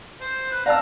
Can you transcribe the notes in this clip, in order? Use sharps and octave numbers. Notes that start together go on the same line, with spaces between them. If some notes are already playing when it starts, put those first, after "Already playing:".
C5
B4
D5 F5 A5 A#5 E6